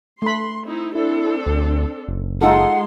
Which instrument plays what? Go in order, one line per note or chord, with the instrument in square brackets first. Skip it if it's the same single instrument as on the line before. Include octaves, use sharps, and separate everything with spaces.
[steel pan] A3 B5 [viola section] C6
[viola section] C4 D#4 E4
[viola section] C4 D4 A4 [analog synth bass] E4
[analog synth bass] D2
F#1
[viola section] G#3 C6 [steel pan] D#4 F4 A4 [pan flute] F#5